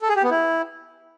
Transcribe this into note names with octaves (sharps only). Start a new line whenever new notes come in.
A4
G#4
G4
B3
E4